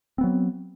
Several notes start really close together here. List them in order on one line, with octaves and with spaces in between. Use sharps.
C4 B3 F#3